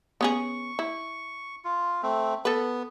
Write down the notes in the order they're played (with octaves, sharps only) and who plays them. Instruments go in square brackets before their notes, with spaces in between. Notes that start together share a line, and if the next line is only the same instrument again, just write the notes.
[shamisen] B3 C#4 G#4 [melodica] C#6
[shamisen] E4
[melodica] F4
A3 C4
[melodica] B3 [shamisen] A4 B4